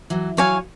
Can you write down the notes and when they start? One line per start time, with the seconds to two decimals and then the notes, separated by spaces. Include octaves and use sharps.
0.10 E3 F#3
0.37 E3 F#3 C#5 F5 G#5